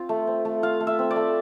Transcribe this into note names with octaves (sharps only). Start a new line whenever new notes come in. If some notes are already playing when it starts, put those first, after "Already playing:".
Already playing: C4 F4
A3
C4
A3
F4 F5
A3
E5
C4
D5
A3